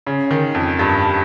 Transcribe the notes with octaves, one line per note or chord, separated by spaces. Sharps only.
C#3
D#3
F2
G2